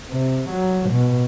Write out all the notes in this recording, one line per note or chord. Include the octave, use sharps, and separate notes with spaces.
C3
F#3
B2